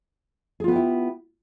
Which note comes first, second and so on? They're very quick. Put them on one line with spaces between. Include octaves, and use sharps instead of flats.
G#4 F4 B3 G4 E4